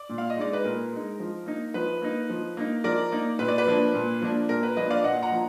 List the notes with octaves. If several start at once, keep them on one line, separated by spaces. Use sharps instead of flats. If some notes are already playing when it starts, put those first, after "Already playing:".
Already playing: D5
A#2
F5
D#5
G#3 D#4 D5
B4
A#2 A#4
G#3 D#4
F3
A#3 D#4
F3 B4
A#3 D#4
F3
A#3 D#4
F3 A#4 D5
A#3 D#4
A#2 B4
D5
B4
F3 A#3 D4
A#2
F3 A#3 D4
A#2 A#4
B4
F3 A#3 D4 B4 D#5
D5 F5
A#2 D#5 F#5
F#5 A#5
F3 A#3 D4